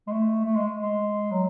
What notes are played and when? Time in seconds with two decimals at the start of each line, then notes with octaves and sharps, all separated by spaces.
0.07 G#3
0.11 A3
0.45 A3
0.55 G#3
0.77 G#3
1.31 F#3